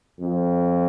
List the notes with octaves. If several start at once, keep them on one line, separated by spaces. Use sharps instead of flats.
F2